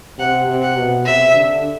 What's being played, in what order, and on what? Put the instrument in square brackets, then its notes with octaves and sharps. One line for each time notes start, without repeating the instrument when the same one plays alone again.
[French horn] C3 [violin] F#5
[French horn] C3
[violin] F#5
[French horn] B2
[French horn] C3 [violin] E5
[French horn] D3